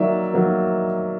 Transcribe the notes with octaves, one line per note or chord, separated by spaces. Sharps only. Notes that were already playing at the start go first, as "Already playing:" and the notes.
Already playing: D#3 F#3 A#3 D#4 D5 E5
D#3 F#3 A#3 D#4